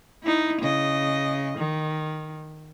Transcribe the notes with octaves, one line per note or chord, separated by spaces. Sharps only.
D#4 E4
C#3 D#5
D#3